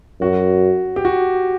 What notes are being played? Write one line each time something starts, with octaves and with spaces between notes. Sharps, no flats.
F#2 F#4
G4
F#4